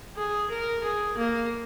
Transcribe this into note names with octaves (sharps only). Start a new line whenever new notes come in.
G#4
A#4
G#4
A#3